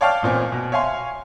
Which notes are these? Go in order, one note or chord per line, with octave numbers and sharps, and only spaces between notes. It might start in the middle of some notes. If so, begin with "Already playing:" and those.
C#5 D5 F5 G5 A5 F6
A1 A#2 C4 G#5
B2
C#5 E5 F5 G#5 C6